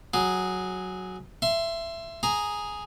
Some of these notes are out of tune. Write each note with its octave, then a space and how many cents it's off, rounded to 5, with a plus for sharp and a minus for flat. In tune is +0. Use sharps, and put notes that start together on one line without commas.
F#3 +0 G#4 +0
E5 +20 C6 +0
G#4 +0 A#5 +0